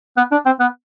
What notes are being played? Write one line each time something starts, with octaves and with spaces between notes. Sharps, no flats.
B3
D4
C4
B3